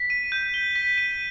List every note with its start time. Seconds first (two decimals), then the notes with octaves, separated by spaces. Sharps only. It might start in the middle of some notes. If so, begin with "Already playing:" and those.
Already playing: B6
0.10 D#7
0.32 G6
0.54 G7
0.75 B6
0.98 D#7